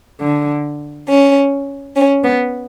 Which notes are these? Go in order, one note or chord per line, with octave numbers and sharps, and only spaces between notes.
D3
C#4
C#4
B3